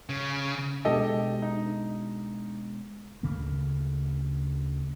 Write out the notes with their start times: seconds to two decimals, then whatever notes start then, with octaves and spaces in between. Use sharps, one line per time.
0.09 C#3
0.85 B2 G#3 D4 G4 A4 D#5
1.42 D#4
3.23 D2 C#3 A3 A#3